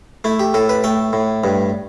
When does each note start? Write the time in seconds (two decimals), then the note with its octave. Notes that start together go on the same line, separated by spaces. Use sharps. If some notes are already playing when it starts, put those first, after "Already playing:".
0.24 A3 E4
0.39 G4
0.54 A2 A4
0.69 B4
0.84 A3 G5
1.13 A2
1.44 G2